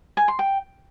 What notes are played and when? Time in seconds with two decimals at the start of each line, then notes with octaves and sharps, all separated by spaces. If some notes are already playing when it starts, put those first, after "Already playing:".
0.17 G#5
0.28 C6
0.39 G5